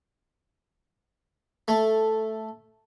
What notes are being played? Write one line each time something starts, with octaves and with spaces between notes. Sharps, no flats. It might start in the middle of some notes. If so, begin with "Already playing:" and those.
A3